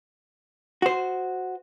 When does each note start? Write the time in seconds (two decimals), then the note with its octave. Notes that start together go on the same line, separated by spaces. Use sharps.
0.82 F#4 C5